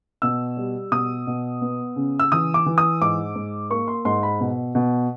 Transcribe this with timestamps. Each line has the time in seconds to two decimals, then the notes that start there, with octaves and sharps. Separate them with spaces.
0.22 B2 E6
0.57 G3
0.91 B2 D#6
1.27 B2
1.62 B3
1.96 C#3
2.19 E6
2.32 E3 D#6
2.54 D6
2.66 E3
2.78 D#6
3.01 G#2 D6
3.35 G#2
3.70 A#3 C#6
3.88 C6
4.05 G#2 C6
4.23 B5
4.40 B2
4.75 B2